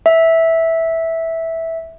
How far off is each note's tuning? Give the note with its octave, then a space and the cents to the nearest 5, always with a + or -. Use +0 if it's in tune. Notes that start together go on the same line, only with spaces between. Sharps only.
E5 -10